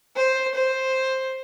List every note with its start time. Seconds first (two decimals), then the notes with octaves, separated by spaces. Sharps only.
0.16 C5
0.54 C5